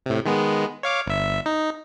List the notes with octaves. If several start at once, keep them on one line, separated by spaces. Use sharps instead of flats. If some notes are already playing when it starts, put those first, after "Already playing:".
A2 C3
D#3 G#3 B3
C#5 F5 D6
G1 E5
D#4